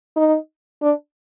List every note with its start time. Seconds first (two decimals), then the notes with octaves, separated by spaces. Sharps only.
0.16 D#4
0.82 D4